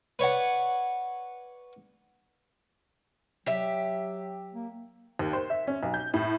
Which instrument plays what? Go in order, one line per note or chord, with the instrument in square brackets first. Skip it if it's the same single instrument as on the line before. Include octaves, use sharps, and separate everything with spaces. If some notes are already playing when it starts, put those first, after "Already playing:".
[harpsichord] B4 C#5 D5 F#5
[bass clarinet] F#3 [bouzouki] G4 E5
[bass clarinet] A#3
[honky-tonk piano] D#2
C5
E5
C#4
B1
G6
A2